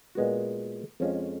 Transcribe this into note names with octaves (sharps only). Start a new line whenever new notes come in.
A#2 G#3 B3 F#4
F2 F3 G#3 C#4 F4